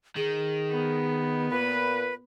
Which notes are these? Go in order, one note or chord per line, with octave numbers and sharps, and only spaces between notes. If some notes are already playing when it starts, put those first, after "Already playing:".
D#3 G#4
B3
A#2 B4